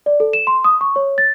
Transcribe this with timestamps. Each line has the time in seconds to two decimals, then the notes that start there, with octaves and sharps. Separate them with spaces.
0.06 D5
0.20 A4
0.33 E7
0.47 C6
0.64 D#6
0.81 C#6
0.96 C#5
1.18 A6